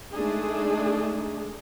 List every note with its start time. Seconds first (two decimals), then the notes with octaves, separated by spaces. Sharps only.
0.14 G#3 A3 D4 D#4 G#4